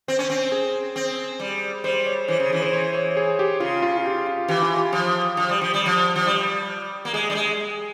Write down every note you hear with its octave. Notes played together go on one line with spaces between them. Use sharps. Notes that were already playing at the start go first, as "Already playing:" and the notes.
C4 C5
C#4
C4
G#4
C4
G3
G3 C5
C#5
E3 C5
C#3
E3 G#4
C5
C#5
C#5
G#4
G4
C#3 F4
F4
F4
G4
F4
E3 G4
F4
G4
F3
F3
G3
F3
G3
F3
F3
G3
A#3
G#3 G#4
G3
G#3